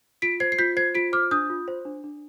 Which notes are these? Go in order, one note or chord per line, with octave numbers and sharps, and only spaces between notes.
F4 B6 D7
C5 G#6 C7
C7
F4 G6 B6
C5 G#6 C7
F4 B6 D7
C5 D6 F6
D4 D#6 G6
F4
C5
D4
D4